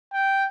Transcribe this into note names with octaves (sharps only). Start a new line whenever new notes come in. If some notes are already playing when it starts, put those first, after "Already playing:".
G5